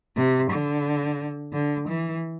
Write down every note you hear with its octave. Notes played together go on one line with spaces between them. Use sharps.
C3
D3
D3
E3